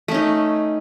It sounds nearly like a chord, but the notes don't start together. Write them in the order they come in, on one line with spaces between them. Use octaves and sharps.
A3 C#4 D#4